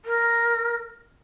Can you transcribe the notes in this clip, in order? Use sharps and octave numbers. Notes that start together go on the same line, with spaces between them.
A#4